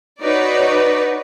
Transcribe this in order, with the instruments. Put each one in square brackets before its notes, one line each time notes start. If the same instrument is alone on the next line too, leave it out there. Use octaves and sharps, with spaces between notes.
[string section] D#4 F#4 B4 C#5 D5